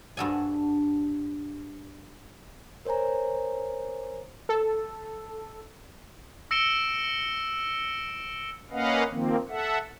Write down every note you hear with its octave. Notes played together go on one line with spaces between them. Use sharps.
G2 D4 F#4 A4 G#5
A#4 C5 C#5 G#5 A#5
A4
E6 A#6 C#7 D7 E7 G7
A#3 C#4 B4 D#5 F5 F#5
D#3 F3 A#3 C4
A4 E5 F#5